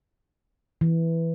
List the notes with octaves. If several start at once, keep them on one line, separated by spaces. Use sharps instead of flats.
E3